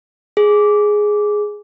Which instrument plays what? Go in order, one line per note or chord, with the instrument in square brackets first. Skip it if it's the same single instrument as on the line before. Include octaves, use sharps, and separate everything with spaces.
[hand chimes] G#4